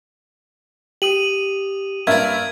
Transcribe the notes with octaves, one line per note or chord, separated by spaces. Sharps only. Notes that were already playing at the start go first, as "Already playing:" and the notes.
G4 D#6 D#7 F#7
G2 A#3 D5 E5 G#6